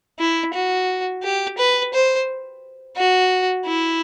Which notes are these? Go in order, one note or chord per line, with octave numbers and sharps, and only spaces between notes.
E4
F#4
G4
B4
C5
F#4
E4